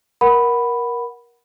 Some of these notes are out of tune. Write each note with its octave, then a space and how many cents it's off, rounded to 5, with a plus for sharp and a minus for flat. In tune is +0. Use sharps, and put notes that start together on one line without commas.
A#4 +20 F#5 +0 B5 +0